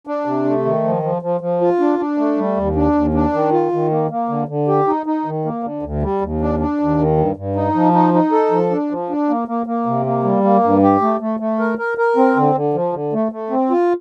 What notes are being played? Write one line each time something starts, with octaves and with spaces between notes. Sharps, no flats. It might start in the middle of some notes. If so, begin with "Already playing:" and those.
D4
C3
A3
D#3
F3
F3
F3
F3
F4
D4
D4
A3
G3
D#2
D4
D#2
D4
D#3
F4
D#3
A#3
A#3
D3
D3
G4
D#4
D#4
D#3
A#3
D3
D2
G3
D#2
D4
D4
D#2
D#3
G2
G2
D#4
F3
D#4
D#4
A4
F3
D4
F3
D4
A#3
A#3
A#3
C3
A#3
G3
A#3
G2
G4
A3
A3
A3
A#4
A#4
A#4
C4
D3
D3
F3
D3
A3
A3
C4
F4